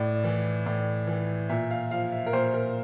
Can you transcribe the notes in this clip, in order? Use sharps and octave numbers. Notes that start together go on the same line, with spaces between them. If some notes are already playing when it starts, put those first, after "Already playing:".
Already playing: A2 D5
E3
A2 D5
E3
A#2 E5
F5
F3 F5
E5
A#4
A#2 C5
A#4